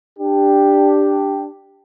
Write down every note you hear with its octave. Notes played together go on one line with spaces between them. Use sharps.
D4 G4